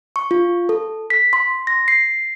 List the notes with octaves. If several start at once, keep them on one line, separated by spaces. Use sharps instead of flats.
C#6
F4
A4
B6
C6
A#6
C7